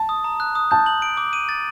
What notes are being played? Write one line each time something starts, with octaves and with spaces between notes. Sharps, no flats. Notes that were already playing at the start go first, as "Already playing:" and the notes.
Already playing: A5
D#6
A#5
F#6
D#6
A5 G6
F#7
D7
D6
D#7
A6